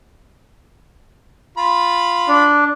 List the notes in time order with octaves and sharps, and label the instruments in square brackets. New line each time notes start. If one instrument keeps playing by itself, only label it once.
[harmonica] F4 B5
[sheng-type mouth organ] D4